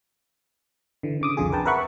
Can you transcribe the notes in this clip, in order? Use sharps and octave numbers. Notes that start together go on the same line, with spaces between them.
D3 E3
C#3 D6 D#6
C2 F2 D3 F4 G#4
A#4 B4 G5 A5
A#4 B4 E5 F#5 B5 C#6